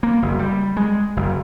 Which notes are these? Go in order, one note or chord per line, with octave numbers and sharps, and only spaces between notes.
A#3
F#1
G3
G#3
F#1